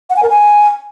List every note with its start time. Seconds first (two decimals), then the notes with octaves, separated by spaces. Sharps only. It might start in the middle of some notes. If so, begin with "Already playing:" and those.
0.10 F#5
0.16 G#5
0.23 A#4
0.29 G#5